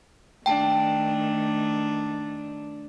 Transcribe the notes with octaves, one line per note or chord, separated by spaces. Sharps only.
D#3 A3 D4 G5 A5